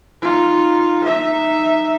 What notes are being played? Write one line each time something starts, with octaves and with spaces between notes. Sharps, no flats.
D#4 F4
D#4 E5